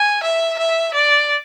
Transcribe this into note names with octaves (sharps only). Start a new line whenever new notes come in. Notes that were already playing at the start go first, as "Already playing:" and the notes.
Already playing: G#5
E5
E5
D5